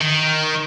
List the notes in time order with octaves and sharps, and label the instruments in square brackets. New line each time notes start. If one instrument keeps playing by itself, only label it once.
[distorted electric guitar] D#3